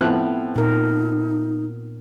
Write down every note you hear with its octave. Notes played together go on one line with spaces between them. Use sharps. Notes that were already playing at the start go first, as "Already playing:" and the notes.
A2 F3 B3 C4 F#6
A#2 D#4 A#4